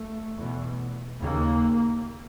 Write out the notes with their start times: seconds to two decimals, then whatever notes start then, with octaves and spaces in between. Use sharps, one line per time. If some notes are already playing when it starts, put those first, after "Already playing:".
Already playing: A3
0.39 E2 B2
1.21 D#2 C#3 A#3